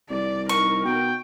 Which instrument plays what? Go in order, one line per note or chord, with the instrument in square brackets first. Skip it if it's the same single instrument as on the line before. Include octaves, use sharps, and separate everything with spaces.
[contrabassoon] C2 [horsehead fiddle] D5
[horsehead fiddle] D#4 A#4 [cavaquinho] C#6
[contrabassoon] B2 [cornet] G5